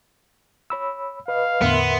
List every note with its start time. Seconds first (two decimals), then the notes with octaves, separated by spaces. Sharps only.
0.70 C#5 B5 E6
1.28 B4 D#5 F5
1.62 E2 A2 D3 B3 A#4 E5 C6